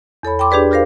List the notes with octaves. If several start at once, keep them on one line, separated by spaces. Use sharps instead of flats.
E2 A4 C#5 B5
G5 B5 C6 D6
D4 G4 G#4 B4 D5
F4 G4 A#4 C5 F5